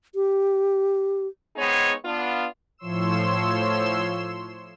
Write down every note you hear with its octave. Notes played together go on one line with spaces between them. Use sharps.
G4
G#3 B3 C4 D#4 G#4 C#5
B3 D4 F4
A2 F3 C#5 C6 E6 E7